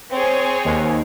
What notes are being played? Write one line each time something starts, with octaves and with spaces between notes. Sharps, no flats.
C4 G#4 C#5
D#2